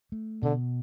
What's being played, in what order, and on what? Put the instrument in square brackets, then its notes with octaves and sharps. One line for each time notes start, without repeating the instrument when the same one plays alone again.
[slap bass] A3
[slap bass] B2 [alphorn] D3